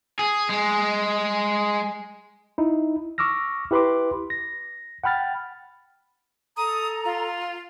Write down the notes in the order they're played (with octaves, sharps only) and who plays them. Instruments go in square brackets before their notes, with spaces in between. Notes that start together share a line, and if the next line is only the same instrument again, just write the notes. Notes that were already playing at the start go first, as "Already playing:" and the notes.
[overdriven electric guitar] G#4
G#3
[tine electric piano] D#4 E4
C#6 D6 E6 F6 A#6
E4 G4 B4 B5 C6 D6
A#6
F#5 G5 B5 F6 A6
[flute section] A4 A#5 [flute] D#6
[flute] F4